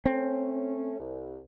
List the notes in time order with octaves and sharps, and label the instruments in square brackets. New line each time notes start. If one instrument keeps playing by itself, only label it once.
[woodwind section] A3 C#4 [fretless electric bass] C4
[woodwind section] C2